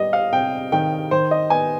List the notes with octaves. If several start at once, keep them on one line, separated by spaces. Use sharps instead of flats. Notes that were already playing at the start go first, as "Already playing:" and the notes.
Already playing: G3 B3 D#5
F5
C3 G5
D#3 G5
D#3 C5
D#5
B3 G#5